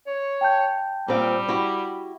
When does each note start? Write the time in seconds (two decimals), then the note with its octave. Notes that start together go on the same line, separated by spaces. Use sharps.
0.07 C#5
0.41 G5 A5 G6
1.08 A#2 G3 C4 F5
1.48 E4 F#4 G4